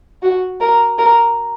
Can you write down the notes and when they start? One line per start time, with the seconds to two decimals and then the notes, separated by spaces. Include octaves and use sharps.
0.22 F#4
0.61 A#4
0.98 A#4